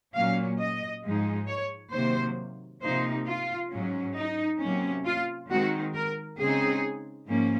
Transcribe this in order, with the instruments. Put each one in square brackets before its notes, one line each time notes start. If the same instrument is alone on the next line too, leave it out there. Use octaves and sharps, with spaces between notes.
[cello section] A#2 F#3 A#3 C#4 F5
D#5
G#2 F3 G#3 D#4
C#5
C3 D#3 F#3 A#3 C5
C3 F3 A#3 D#4 C5
F4
G#2 F#3 C#4
D#4
C3 F#3 A#3 C#4
F4
D#3 G#3 C4 D#4 F#4
A#4
C#3 G#3 C4 D#4 G#4
G#2 F3 A#3 C#4